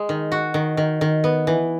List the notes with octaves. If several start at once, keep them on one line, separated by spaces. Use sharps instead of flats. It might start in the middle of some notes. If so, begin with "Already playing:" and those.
Already playing: G#3
D#3
F#4
D#3
D#3
D#3
B3
E3